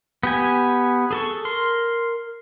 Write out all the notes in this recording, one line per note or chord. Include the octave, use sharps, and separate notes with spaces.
B3 G4 G#5
G#4 A4 C#6
A#4 C6